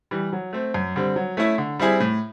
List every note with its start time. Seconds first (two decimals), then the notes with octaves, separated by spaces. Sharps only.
0.11 E3 G3
0.33 F#3
0.53 A3 C4
0.74 F#2
0.96 D3 G3 C4
1.16 F#3
1.37 A3 C#4 E4
1.58 D3
1.79 G3 C4 E4 G#4
2.00 A2